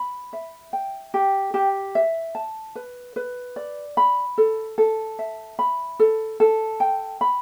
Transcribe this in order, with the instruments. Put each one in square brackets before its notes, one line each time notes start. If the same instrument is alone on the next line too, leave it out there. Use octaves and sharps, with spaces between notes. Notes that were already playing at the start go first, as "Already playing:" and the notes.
Already playing: [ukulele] B5
E5
G5
G4
G4
E5
A5
B4
B4
D5
B5
A4
A4
E5
B5
A4
A4
G5
B5